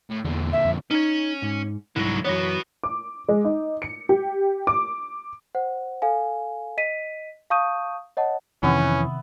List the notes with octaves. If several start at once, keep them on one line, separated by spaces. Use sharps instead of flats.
A2
E2 A#2 D3
E5
F2
C#4 D#4 C#5
G#2
C2 G#2 D3 F#3 E4
F#2 E3 B3 F#4 C#5
D6
G#3
D#4
C#7
G4
D6
C5 F#5
A4 F5 G#5
D#5 B6 D#7
F5 A5 C#6 D#6 G6 D#7
C#5 D#5 F#5 A5
F2 C3 D#3 E3 B3 C#4 E5